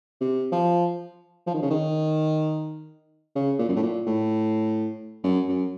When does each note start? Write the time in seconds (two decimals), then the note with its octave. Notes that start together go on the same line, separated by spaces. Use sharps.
0.21 C3
0.52 F3
1.47 F3
1.54 D#3
1.62 C#3
1.70 D#3
3.35 C#3
3.59 A#2
3.69 F#2
3.76 A2
3.83 A#2
4.06 A2
5.24 F#2
5.48 F#2